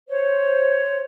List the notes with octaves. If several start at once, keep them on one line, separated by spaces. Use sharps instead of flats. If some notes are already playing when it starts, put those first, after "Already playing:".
C5 C#5